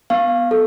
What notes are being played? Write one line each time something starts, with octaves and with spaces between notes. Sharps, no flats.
B3 F5
A4